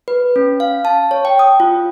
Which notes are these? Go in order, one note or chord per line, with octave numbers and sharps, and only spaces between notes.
B4
C#4
F5
A5
C#5
G5
D#6
F4